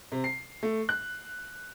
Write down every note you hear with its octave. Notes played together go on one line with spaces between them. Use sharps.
C3
C7
A3
F#6